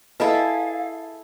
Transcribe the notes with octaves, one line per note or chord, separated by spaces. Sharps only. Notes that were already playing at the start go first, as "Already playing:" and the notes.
E4 G#4 A4 B4 D#5 F5 G#5